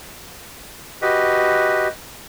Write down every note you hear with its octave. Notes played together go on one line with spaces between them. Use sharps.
F#4 G4 B4 D#5